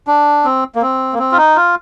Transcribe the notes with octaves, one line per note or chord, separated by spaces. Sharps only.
D4
C4
A#3
C4
A#3
C4
F4
D#4
F4